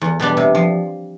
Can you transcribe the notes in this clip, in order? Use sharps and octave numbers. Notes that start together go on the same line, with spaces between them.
E2
B2 G3 B3 D4
C3
F3